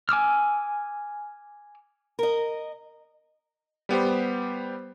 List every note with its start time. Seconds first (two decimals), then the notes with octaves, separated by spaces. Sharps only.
0.09 G#5 D6 E6 F6
2.19 A#4 D#5
3.89 G3 B3 G4 C5